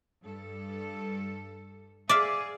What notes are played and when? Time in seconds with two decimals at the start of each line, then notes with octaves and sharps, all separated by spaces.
0.23 G2 A4
2.10 G#4 D5 E5 F5 D6